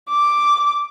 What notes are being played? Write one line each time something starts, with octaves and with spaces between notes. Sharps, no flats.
D6